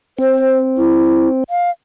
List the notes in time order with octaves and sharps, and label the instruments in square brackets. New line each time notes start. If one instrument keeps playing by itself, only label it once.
[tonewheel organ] C4 [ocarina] C5
[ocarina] E4
F5